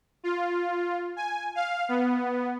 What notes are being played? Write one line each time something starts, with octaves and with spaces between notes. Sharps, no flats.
F4
G#5
F5
B3